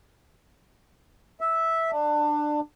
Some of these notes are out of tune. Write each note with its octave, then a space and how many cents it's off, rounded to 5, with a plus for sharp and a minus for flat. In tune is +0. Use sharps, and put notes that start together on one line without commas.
E5 -10
D4 +20